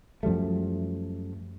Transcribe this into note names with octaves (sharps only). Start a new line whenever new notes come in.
F#2 F3 G3 A3